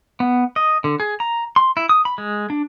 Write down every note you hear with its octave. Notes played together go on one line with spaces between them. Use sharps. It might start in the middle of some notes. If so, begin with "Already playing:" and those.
B3
D#5
D3
G#4
A#5
C6
E4
D#6
B5
G#3
D4